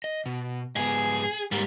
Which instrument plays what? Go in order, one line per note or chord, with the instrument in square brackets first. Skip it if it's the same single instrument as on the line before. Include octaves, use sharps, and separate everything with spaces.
[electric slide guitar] D#5
B2
[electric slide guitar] G#2 B3 [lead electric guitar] G#4
[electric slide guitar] G#2 [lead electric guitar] G3 A#3